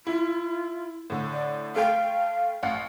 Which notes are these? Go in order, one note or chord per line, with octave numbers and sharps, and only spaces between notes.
E4 F4
A2 D3
D5
A3 F5 G5
A1 F5 F#5